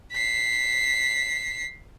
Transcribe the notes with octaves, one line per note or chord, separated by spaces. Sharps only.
B6 C7